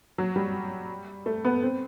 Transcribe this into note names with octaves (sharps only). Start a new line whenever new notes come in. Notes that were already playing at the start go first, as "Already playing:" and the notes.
F#3
G3
A3
B3
C4